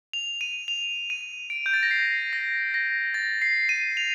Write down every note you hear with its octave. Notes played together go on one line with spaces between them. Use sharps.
F7
D#7
F7
D#7
D7
G6
A6
A#6
C7
A#6
A#6
A6
C7
D#7
F7